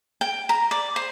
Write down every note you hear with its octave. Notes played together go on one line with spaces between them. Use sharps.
G5
A#5
D5
C5